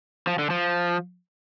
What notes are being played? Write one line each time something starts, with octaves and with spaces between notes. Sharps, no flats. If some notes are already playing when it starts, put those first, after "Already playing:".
F3
D3
F3